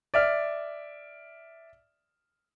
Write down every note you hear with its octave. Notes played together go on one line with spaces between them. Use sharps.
D5 E5 F6